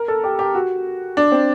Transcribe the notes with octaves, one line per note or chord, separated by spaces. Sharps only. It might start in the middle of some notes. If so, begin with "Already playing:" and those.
Already playing: A#4
A4
G4
G4
F#4
D4
C4